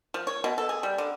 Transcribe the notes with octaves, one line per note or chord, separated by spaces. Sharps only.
F3
C#5
B2
A4
G#4
G3
D3